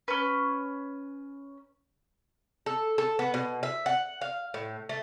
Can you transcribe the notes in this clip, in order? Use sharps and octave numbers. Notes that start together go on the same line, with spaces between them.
C#4 B4
A4
A4
B3
B2
E5
F#5
F5
A2
A3